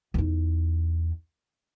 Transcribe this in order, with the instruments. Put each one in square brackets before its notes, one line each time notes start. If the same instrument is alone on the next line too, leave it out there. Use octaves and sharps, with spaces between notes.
[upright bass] E2 D#4